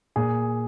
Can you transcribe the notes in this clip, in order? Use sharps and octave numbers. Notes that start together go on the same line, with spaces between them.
A#2 G#4